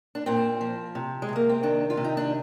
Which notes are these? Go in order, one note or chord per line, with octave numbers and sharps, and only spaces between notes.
D4
A#2 C4
F3
C3
G#3
C3
A#3
C4
D#3 D4
F4
C3
D#4
D4